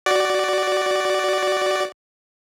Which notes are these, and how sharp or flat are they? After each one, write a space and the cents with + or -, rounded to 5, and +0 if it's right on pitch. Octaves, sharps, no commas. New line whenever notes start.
F#4 +15 D5 +0